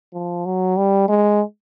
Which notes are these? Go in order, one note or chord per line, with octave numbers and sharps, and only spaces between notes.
F3
F#3
G3
G#3